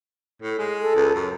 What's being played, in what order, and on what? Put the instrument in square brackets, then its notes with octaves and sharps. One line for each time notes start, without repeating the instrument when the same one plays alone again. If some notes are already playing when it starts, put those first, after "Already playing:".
[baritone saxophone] A2
G#3
[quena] A4
[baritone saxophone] C#2
F#2